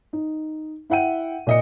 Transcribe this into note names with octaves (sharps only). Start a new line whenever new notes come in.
D#4
E4 E5 F#5 G5 D#7
A#2 D#5 C#7